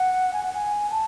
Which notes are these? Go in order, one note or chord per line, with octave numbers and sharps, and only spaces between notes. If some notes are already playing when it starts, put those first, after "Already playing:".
Already playing: F#5
G#5
F#5
G#5
A5